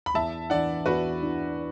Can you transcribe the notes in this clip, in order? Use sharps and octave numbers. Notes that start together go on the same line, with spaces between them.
B5
E2 E5 A5
E3 D4 D5 F#5
E2 F#4 B4
E3 D4